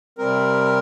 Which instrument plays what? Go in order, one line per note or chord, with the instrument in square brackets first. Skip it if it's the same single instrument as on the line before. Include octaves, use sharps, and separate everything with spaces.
[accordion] C3 G3 C4 A#4